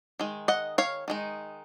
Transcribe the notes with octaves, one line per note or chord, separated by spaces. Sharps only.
D#3 G#3
D#5 F#5
C#5 F5
D#3 G#3 D#4